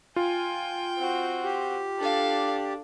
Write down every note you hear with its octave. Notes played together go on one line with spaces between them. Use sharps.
F4 G5 G#5
C4 F#4
G4
D4 A4 D5 F5